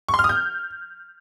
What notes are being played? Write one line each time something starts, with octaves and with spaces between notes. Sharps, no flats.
C#6
C6
F6
D#6
G6